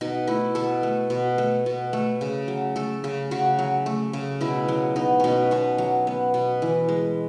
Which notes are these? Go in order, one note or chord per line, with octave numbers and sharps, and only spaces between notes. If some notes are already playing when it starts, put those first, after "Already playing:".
B2 D#4
A3 E4
B2 A4
A3
B2
A3
B2
A3
C#3
F#3
A3 A4
C#3
C#3 F#4
F#3
A3
C#3
B2 E4
F#3
B3 D#4
B2 C#4 D#4
B2 C#4
F#3
B3
B2
E3
G#3